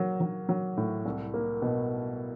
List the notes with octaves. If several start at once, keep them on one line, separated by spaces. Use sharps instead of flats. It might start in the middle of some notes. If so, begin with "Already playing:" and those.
Already playing: F#3 A#3
F#3
F#3
A2
C2
A#3
B2